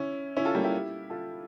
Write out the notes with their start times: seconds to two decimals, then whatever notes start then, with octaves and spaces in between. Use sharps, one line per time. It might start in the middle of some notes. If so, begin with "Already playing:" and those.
Already playing: C#4 E4
0.37 C#4 E4
0.45 F4 A4
0.55 G3 A#3
0.64 E4 G4
1.10 F4 A4